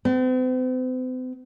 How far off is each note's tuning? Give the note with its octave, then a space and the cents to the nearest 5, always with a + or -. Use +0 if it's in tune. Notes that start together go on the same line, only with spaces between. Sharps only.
C4 -45